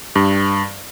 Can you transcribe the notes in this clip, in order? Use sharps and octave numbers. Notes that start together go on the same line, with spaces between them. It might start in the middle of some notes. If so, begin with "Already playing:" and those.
G2